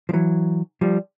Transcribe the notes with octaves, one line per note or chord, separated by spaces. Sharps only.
F3
E3 F#3
F3 G3